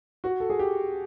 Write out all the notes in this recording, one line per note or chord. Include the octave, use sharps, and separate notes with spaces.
F#4
A4
G#4
G4